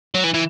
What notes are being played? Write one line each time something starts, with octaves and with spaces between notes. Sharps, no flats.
F#3
E3
E3